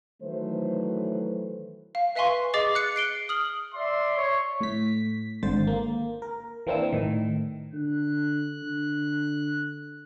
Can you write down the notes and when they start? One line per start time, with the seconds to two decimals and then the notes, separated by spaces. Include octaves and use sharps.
0.23 D#3 E3 F#3 A3 B4 C5
1.95 F5
2.16 B4 E5 F5 G#5 C6 C#6
2.54 G#4 D#5 D6 A6 C7
2.75 F#6 C#7
2.96 C7 D7 G7
3.29 D#6 F6 F#7
3.74 D5 E5 C6
4.17 C#5
4.61 A2 B6
5.43 G#1 D3 C5 A6
5.67 A#3
6.22 A#4
6.67 E3 A#3 C4 D4 E4 E6
6.92 A2 D#3
7.73 D3 F#6
8.63 D3